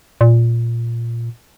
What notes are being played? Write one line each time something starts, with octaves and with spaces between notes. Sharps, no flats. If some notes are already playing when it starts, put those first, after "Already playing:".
A#2